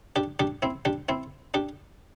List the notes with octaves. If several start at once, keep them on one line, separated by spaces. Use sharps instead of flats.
D4 G4
D4 G4
C4 E4
D4 G4
C4 E4
D4 G4